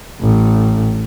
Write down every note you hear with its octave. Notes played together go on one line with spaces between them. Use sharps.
A1